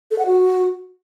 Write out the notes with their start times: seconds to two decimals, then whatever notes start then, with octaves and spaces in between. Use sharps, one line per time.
0.11 A4
0.18 F#5
0.26 F#4